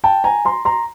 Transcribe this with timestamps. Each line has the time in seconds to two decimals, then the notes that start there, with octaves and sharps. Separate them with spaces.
0.04 G5 A5
0.24 G#5 A#5
0.45 A#5 C6
0.65 A#5 C6